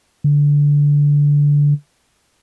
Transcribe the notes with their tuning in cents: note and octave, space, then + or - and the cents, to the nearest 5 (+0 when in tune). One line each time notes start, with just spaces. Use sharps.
D3 -15